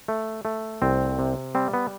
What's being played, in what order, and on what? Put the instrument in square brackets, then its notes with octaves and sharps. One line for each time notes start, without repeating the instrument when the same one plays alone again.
[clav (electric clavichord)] A3
A3
C2 C4
C3
G3 C4
B3